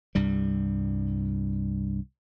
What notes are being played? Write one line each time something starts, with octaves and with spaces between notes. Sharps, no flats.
C2 G2 G3